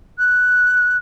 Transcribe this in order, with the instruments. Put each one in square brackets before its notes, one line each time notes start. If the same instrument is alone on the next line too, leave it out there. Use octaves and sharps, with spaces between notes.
[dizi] F#6